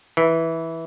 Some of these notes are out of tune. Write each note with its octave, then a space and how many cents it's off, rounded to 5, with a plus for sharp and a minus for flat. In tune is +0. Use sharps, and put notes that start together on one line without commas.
E3 -10